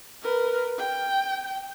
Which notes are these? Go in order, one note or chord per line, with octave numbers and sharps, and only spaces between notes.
A#4 B4
G5